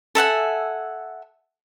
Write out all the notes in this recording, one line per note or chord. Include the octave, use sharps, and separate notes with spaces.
A4 E5 F#5 G#5